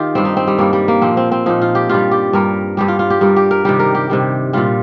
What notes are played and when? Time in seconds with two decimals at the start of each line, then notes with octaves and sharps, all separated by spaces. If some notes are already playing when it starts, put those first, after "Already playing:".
Already playing: D#3 F4 G4
0.15 G2 G3 C4
0.25 D#4
0.37 C4
0.47 G3
0.58 G2 G3 A#3
0.73 G3
0.88 A#3
1.02 A#2 F3 C4
1.17 C4
1.31 C4
1.46 A#2 F3 D#4
1.61 F4
1.75 G4
1.89 G2 G3 F4
2.11 G4
2.33 G2 G3 A#4
2.77 G2 G3 G4
2.88 F4
2.99 F4
3.10 G4
3.21 G2 G3 A#4
3.36 G4
3.51 A#4
3.65 C3 D#3 G3 G4
3.79 A#4
3.95 G4
4.10 C3 D#3 G3
4.53 A#2 G3 F4